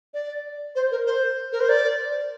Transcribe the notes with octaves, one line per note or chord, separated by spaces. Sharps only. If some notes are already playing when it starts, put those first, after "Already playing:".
D5
C5
A#4
C5
A#4
C5
D5